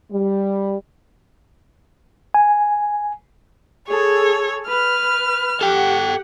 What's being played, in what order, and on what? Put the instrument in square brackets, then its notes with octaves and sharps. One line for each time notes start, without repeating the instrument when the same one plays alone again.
[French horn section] G3
[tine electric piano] G#5
[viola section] G#4 A4 [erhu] C#5
[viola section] B4 [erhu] F6
[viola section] G4 F#5 [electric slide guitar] A4 G5